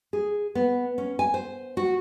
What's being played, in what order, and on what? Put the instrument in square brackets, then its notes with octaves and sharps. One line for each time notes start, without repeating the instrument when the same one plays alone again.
[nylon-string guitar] G#4
B3
C#4
G#5
C5
F#4